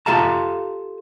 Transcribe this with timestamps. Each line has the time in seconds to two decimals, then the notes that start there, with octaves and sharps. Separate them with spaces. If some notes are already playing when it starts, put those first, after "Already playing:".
0.06 F4 G4 A4 F5 A5 A#5